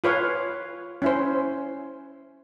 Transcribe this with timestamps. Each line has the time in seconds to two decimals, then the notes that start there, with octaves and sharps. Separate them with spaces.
0.04 F4 B4 C#5 F5
1.02 C#4 E4 C5